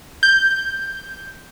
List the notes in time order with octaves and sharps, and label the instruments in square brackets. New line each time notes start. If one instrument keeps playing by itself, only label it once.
[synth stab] G6